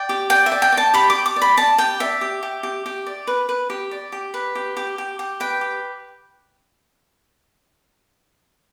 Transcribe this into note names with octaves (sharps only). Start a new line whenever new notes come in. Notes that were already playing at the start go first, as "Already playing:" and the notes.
Already playing: D5 G5
G4
D5 G5
E5
D5
G5
D5
A5
G4 B5
D6
G4
D6
D5
B5
D5 A5
G4 G5
D5 E5
G4
G4
G4
G4
D5
B4
B4
G4
D5
G4
B4
G4
G4
G4
G4
B4 G5
G4